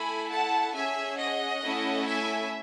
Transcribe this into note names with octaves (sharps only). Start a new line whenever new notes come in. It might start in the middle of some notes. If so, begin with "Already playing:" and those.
Already playing: A3 E4 A4 G#5 B5
F#5 A5
C#4 G#4 E5 G#5
D#5 F#5
A3 C#4 E4 A4
E5 G#5